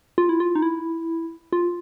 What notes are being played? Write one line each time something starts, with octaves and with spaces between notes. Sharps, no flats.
F4
E4
F4
D#4
E4
F4